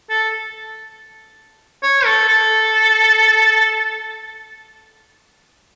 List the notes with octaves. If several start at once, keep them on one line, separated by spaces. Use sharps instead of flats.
A4
C#5
A4
A4